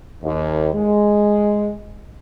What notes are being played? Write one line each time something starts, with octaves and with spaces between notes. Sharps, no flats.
D#2
G#3